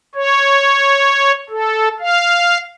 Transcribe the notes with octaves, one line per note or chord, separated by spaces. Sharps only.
C#5
A4
F5